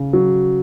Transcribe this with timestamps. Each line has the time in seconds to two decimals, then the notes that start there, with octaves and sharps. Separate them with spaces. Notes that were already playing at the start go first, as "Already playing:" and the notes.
Already playing: C#3
0.13 F#3